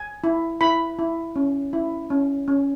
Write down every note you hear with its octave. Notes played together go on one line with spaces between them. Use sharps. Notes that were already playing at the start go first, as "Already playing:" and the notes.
Already playing: G#5
E4
E4 B5
E4
C#4
E4
C#4
C#4